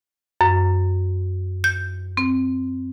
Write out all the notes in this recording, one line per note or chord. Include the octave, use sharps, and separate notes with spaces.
F#2
G6
C4